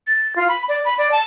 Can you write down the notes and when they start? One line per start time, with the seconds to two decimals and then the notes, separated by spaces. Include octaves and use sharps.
0.07 A6
0.36 F4
0.49 B5
0.68 D5
0.85 B5
0.98 D5
1.12 A5